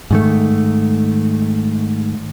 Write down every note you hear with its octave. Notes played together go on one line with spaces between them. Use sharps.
G#2 D#3 A3